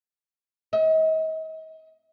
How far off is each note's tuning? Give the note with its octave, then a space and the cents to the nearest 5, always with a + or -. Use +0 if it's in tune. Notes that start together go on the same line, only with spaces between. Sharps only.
D#5 +40